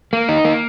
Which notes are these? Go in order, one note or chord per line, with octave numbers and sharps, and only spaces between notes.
A#3
D#4
A#3